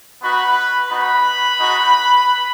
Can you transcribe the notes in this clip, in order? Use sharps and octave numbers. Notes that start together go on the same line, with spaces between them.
B3 D#4 F#4 B4 B5
B3 D#4 F#4 B4 B5
G#3 D#4 F#4